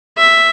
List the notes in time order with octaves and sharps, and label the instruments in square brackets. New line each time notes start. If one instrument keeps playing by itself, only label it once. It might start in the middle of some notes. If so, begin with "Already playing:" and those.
[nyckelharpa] E5